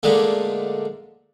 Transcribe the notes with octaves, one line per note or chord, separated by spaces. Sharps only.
A#2 D3 G#3 A3